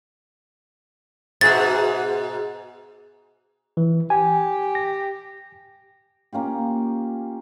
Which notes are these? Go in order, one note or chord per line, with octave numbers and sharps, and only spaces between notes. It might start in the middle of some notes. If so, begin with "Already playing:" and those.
G#2 B2 F#4 G#4 E5 A6
E3
G4 G#5
A#6
A#3 C#4 F4 G4